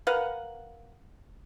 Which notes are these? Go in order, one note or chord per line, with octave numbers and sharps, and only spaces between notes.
A#4 B4 F5 F#5